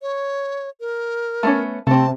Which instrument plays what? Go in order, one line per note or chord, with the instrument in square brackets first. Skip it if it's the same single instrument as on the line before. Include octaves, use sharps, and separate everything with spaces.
[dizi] C#5
A#4
[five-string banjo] A3 B3 C#4
[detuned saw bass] C3 [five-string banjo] A3 C4 [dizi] A5